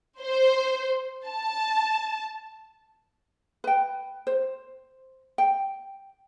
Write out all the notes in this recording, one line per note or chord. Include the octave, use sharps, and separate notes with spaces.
C5
A5
B4 G5
C5
G5